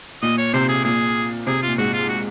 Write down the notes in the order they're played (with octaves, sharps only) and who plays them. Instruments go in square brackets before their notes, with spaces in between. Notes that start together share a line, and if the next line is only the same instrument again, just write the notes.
[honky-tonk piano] A#2 [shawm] D#5
[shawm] C#5
[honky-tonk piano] C3 [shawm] C5
[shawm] G#4
[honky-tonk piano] A#2 [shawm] G#4
[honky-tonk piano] C3 [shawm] G#4
[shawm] F4
[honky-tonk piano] A#2
[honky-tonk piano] G#2 [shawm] F#4
[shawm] F4
F#4